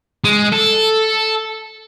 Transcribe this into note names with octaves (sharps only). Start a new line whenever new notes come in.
G#3
A4